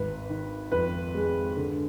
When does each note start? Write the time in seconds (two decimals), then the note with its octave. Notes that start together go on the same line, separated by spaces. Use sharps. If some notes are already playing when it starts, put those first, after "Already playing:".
Already playing: G#1 B4
0.29 D#3
0.72 F2 B4
1.15 G#3
1.57 D3